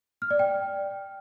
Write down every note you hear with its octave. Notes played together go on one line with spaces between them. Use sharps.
F6
D5
G5